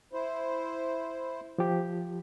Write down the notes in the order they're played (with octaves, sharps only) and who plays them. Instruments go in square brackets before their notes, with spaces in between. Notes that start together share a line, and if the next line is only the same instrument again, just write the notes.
[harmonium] E4 C5
[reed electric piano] F3 G4